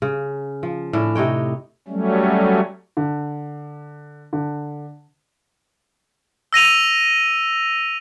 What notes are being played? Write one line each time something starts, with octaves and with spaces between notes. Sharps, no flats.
C#3
F3
A2 C#4 D4
C3 D#4 C#5 G5
F#3 G3 A3 C#4
D3
D3
E6 A#6 D#7 F7